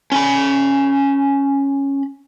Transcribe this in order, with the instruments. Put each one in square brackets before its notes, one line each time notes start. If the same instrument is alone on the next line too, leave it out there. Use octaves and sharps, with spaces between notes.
[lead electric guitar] C#4 B5